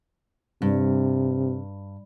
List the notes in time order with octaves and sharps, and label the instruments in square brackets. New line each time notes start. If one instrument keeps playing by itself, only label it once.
[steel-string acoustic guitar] G2 [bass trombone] C3